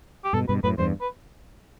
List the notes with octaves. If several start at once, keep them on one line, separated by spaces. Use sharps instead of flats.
G4
G2 B2 A4
G2 B2 B4
F#2 A2 B4
E2 G2 C5
B4